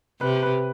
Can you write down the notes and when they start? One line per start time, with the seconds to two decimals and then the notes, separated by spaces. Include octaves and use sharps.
0.21 C3 B4
0.43 B4